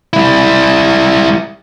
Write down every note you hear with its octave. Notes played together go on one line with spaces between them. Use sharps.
G3 E4